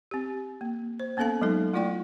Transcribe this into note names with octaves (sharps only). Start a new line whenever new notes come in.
C4 G4
A#3
C5
A#3 B3 C#4 A4 F5 A5
F#3 G#3 D#4 A4
A3 E4 F4 D5 G5 C#6